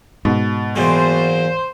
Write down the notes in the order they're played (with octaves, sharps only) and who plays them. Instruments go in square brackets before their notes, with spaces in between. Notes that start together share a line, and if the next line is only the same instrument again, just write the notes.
[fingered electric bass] G#2 [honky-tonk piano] B2
[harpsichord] E2 A#2 F#3 [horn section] C5